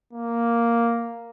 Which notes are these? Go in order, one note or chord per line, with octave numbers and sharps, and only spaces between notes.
A#3